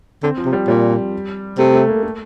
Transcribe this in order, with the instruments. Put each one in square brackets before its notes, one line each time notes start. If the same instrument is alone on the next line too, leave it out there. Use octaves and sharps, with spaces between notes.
[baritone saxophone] D3 [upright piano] C4
[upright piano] F3
[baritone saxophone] C3
[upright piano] G3
[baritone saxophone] A#2 [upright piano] G3
[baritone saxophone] C3 [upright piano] A3
[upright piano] A3
A#3
A3